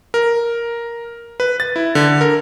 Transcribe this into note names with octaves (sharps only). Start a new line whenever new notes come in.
A#4
B4
A6
E4
D3
A#4